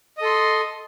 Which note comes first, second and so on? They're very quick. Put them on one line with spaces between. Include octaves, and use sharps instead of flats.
D#5 A4 C6